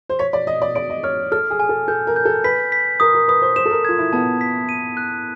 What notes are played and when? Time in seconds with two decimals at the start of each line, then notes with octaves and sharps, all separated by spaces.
0.09 C5
0.19 C#5 B6
0.33 D5
0.47 D#5 D#6
0.62 D5
0.75 D5 D7
0.90 D#5
1.03 C#5 F6
1.32 A4 F6
1.50 G#4
1.60 G#5
1.69 A4
1.88 A4 G6
2.07 A#4
2.16 G6
2.25 A4
2.44 B4 B6
2.72 B6
3.00 A#4 D#6
3.14 A#4
3.28 B4 D#6
3.42 C5
3.56 C5 E7
3.65 A4
3.71 A#4
3.85 F4 G#6
3.98 E4
4.13 B3 A5
4.41 B6
4.69 D#7
4.97 F#6